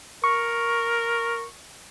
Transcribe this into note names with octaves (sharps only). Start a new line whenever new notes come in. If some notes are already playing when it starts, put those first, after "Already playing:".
A#4 C#6